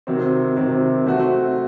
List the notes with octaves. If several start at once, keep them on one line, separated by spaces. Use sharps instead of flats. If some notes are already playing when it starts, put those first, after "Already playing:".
C3 D#3 F#3 C4
C3 D#3 F#3 C4
F#3 A3 C4 F#4